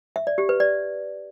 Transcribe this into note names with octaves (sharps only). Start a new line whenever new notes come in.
E5
D5
G4
B4
D5